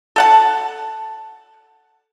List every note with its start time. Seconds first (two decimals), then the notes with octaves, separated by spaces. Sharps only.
0.16 A4 F#5 A5